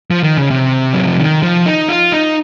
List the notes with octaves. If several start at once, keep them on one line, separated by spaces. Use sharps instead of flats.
F3
D#3
C#3
C3
F#3
F3
D#3
F3
D#4
F4
D#4